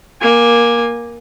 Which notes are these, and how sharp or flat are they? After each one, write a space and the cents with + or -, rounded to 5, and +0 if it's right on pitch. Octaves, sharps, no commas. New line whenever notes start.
A#3 +15 G#5 -15